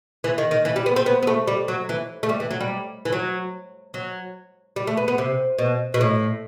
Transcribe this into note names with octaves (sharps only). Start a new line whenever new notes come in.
E3
D#3
D#3
E3
G3
B3
C4
B3
B3
A3
G3
F#3
E3
A3
G3
E3
F#3
G3
E3
F#3
F#3
G3
A3
B3
B3
C3
B2
B2
A2